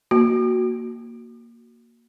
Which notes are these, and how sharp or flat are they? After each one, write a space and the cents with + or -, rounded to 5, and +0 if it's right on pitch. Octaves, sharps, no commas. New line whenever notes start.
A#3 +0 F#4 +0